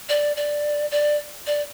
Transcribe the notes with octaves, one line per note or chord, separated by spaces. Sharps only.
D5
D5
D5
D5